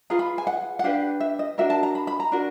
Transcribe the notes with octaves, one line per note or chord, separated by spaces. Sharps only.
F4 G#4 B4 A#5
B5
G#5
F#5
F#5
D4 G4 B4 F5
E5
D#5
D4 F#4 A#4 E5
A5
A#5
B5
B5
A#5
D4 F#4 A#4